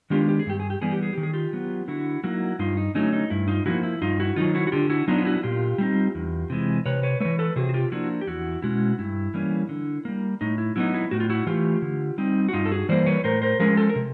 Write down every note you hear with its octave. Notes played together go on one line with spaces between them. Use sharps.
D#3 G#3 B3 D4 F4 G4
G4
G#4
G2 G4
G#4
G4
E3 G3 B3 G#4
G4
G#4
D#3 G4
G#4
F4 G4
F#3 B3
D3 E4 F#4
F#3 A#3 D#4 E4 F#4
G2 D#4 F4
D#4
D3 F#3 A3 C#4 D#4
D#4
G2 E4
D#4 F4
D3 F3 A#3 E4 F#4
E4
G2 D#4 F4
E4 F#4
D#3 F#3 D#4 F4
E4 F#4
F#4
D3 F4 G4
E4 F#4
F#3 B3 D4 D#4 F4
F4
E4 F#4
A#2 F4 G4
G3 C4 D#4
E2
C3 E3 G#3
C3 B4 C#5
B4 C#5
E3 A3 B4 C#5
A4 B4
C3 F#4 G#4
F#4
F4 G4
F3 A#3 D4 E4 F#4
G4
E2 E4 F#4
B2 G#3 C#4 E4 F#4
G2 E4
E3 G3 A#3 C#4
D3
G3 A#3
A2 D#4
E4
F#3 B3 D#4 E4
E4
A2 F#4
F4
E4 F#4
E3 A3 F4 G4
D3
G3 C4 D#4
F#4
G2 D#4 F4
A4
F#4 G#4
E3 G3 A#3 C5 D5
B4 C#5
A2 A#4 C5
A#4 C5
F3 G#3 C#4 G#4 A#4
A4
A#4
C3